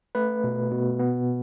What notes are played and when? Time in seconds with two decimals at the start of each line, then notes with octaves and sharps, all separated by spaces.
0.15 A3 B4
0.44 B2
0.71 B2
0.99 B3